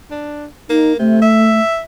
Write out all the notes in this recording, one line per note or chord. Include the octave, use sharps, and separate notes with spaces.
D4
A#3 D#4
C3 A3
E5